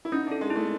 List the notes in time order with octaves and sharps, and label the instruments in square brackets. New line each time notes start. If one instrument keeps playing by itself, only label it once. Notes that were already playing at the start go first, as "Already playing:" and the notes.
[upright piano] E4
[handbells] C#4 [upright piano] D#4
[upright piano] D4 [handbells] A4
[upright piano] G#3
[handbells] E4
[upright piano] A3